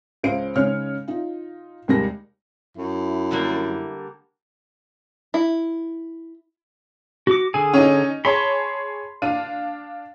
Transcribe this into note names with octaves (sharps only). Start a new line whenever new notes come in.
C#2 G#3 C#4 C5 F5 D7
C#3 G#3 C#4 D#4 C#5 F6
D#4 F4
D#2 C3 G3 G#3 A#4 A#6
F#2 E4
D3 G3 A#3
E4
F#4 D6
D3 G#4 G#5
C#4 D#4
G#4 C#5 A5 B5 C6
D4 F5 D#7